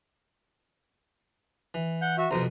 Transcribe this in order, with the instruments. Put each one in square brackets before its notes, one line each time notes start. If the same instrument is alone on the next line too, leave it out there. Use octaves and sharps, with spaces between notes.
[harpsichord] E3
[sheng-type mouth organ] F#5 G6
F#4 E5
[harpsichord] C2 F2 B2 [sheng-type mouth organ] C5 A#5